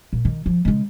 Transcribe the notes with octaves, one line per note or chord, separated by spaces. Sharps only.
A#2
D#3
F3
C#3 G#3